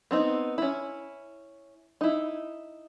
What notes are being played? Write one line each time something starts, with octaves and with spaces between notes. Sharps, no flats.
B3 C4 D#4
C#4 E4
D#4 E4